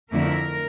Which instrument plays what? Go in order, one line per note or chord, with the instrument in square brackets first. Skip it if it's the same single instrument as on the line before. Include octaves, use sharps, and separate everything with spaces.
[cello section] F2 D3 A3 E4 A#4